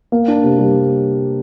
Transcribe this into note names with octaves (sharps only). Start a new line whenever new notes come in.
A#3
D4
C3
G3